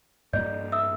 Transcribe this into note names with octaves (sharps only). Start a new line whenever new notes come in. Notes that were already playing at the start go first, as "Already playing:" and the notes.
G2 A#3 D5 D#5 G6
E5 D#6 E6